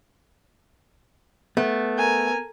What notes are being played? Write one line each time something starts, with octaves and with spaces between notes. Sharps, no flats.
A3 B3
A#4 G#5